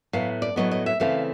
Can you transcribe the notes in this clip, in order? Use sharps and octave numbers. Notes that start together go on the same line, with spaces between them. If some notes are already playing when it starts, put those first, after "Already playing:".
A2 F#3 B3 F5
D5
A2 F#3 B3 D#5
D#5
E5
C#3 E3 A3 C4 F5